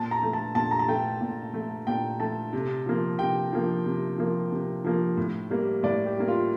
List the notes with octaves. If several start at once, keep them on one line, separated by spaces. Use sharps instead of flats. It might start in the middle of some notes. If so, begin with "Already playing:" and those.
Already playing: A#2 A5
A#5
A3
A5
A#2 A5
A#5
A5
A3 G5
A#2
A3
A#2 G5
A3 A5
C3
F3 A#3
C3 G5
F3 A#3
C3
F3 A#3
C3
F3 A#3
A2
G3 A#3
A2 D5
G4
G3 A#3
F4